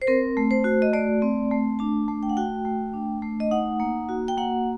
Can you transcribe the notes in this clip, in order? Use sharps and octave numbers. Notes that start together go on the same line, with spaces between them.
C5
C4 A#4
A3
C5
F#4
D#5
A3 D5
C4
A3
D4 A5
A3
G5
F#5
F#4 G5
A3
D4
A3
D#5
D#4 F#5
A#3
F#4
G5
A#3 F#5